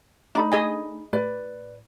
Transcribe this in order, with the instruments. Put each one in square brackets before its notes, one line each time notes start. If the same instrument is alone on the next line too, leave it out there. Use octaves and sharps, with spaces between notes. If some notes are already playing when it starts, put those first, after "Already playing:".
[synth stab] A3 D4 [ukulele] D#4 B5
[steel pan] G#4 D#5 G#5
[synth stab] A2 [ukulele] B4 D5